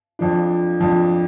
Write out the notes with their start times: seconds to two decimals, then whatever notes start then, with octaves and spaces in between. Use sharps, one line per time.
0.19 F2 F3 D4
0.80 F2 F3 D4